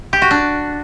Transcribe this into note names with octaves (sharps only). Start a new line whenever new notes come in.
G4
F#4
D4